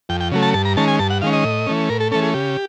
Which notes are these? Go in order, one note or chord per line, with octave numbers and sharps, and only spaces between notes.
F2 G5
G5
C#3 F#3 A3
A5
G2 A5
A#5
D#3 G#3 C#4 A5
G#5
G2 A5
F#5
D#3 G#3 C#4 F5
D#5
A2
E3 A3 C#4
A2 A#4
A4
E3 A3 C#4 A4
G#4
C#3 G4